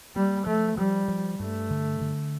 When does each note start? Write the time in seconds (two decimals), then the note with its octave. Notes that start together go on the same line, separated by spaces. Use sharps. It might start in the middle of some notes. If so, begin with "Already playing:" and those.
0.15 G3 A#3
0.46 F3 A3
0.78 F3 G3
1.08 F3
1.40 G2 A3
1.71 D3
2.01 D3